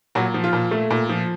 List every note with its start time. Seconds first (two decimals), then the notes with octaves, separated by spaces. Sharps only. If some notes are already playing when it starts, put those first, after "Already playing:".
0.15 A#2 F#3 F#4
0.34 F3
0.44 F4
0.53 A#2
0.71 A3
0.91 A#2
1.09 F3